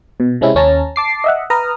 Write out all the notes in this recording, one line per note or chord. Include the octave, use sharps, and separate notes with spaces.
B2
C3 G#3 C4 C#4 E4
D#2 C#4 A5 A#5
A5 D6 C7
D#5 E5 F#5
B4 A#5 D#6 F6